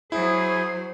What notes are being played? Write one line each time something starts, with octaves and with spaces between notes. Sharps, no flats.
F#3 E4 G#4 C5